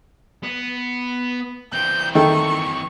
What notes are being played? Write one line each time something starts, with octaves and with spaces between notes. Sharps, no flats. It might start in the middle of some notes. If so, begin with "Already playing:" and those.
B3
E3 C4 G6
D#3 E4 A4 C#6